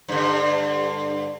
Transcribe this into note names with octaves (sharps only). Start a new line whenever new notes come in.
G2 D3